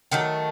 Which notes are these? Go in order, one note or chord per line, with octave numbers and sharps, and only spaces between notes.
D#3 F#3 A3 G4